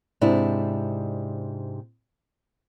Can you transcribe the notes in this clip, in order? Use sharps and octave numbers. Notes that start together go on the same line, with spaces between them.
G#2 C3 D4 E4